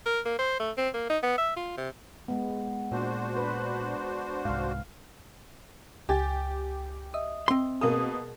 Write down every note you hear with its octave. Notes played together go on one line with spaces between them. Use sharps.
A#4
A#3
C5
A3
C4
A#3
D#4
B3
E5
F4
C3
G#3 B3
A#2 D4 F#4 C5
B4
C2 G#2 F5
C#2 G4 G#5 A6
D#5 E5 D#6
C4 C6
B2 A#3 G#4 A#4 D#6